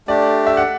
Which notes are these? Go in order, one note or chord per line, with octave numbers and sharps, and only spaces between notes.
A3 D4 G4 D5
E5
F#5